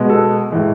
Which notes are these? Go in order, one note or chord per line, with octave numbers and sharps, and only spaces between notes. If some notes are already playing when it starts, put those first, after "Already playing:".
Already playing: B2 G#3 B3
A4
A2 E3 G#3